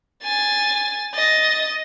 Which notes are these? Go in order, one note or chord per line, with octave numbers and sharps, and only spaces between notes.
G#5 A6
D#5 A6